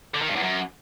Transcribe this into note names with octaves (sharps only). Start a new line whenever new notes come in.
D3
D#3
G2
E2
F#2